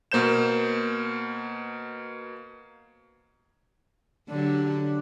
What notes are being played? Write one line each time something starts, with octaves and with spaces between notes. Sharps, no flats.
B2 A#3 C5 G6 E7
D3 F#3 D4 G4